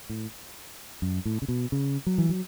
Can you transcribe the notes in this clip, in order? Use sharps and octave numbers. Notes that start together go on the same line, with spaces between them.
A2
F#2
A2
C#3
B2
C#3
F#3
E3
F#3